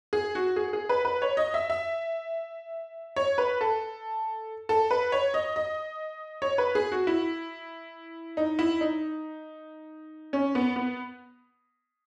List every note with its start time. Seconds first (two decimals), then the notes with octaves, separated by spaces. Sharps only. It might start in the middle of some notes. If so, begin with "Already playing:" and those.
0.13 G#4
0.35 F#4
0.56 G#4
0.73 G#4
0.89 B4
1.05 B4
1.22 C#5
1.37 D#5
1.54 E5
1.70 E5
3.16 C#5
3.38 B4
3.61 A4
4.69 A4
4.91 B4
5.12 C#5
5.34 D#5
5.56 D#5
6.42 C#5
6.58 B4
6.75 G#4
6.92 F#4
7.07 E4
8.37 D#4
8.59 E4
8.81 D#4
10.33 C#4
10.55 B3
10.76 B3